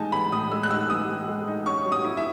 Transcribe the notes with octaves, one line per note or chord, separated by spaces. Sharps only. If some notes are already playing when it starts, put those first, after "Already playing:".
Already playing: A2 E3 G#3 D#4 G#5 A5
E3 B5
A2 D#6
G#3 E6
F#6
D#4 E6
E3 D#6
A2
G#3
D#4
C#4 C#6
F#3
D#6
E4
E5